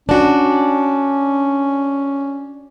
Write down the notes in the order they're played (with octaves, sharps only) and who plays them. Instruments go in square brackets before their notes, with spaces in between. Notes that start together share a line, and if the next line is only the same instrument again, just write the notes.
[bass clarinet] C#4 [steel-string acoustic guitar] D4 F#4